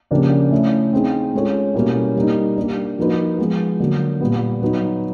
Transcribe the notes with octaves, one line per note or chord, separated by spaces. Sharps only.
C#3 F3 A#3 D4 G4
A3 C#4 E4
C4 D#4 G#4
G#3 C#4 F4 A4 C#5
B2 G3 A#3 C#4 E4
G3 A#3 D#4
A#3 D4 G4
F3 A#3 D#4 F#4 B4
F3 G#3 B3
D3 F#3 A#3
A#2 G3 B3
F#3 B3 D#4